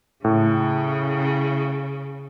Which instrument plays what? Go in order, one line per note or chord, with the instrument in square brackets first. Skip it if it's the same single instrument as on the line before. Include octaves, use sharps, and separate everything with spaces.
[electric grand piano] A2 [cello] C#3